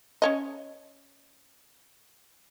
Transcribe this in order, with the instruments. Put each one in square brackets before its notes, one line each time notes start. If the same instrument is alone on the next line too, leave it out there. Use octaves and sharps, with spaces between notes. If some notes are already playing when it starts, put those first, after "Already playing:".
[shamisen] C#4 C#5 D#5